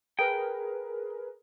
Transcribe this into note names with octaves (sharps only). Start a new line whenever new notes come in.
G#4 A#4 B4 G5